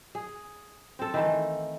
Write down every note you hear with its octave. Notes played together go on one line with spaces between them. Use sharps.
G#4
C4 A4
D#3 E3 A3